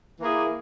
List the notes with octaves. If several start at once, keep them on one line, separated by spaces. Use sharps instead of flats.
E3 A#3 E4 G#4